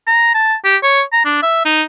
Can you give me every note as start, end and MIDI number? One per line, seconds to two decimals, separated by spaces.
0.07 0.33 82
0.34 0.54 81
0.64 0.76 67
0.83 1.02 73
1.13 1.21 82
1.25 1.42 62
1.43 1.64 76
1.65 1.82 63